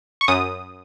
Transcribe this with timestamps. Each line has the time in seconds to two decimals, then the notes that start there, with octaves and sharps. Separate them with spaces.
0.21 C#6
0.28 F#2 D#6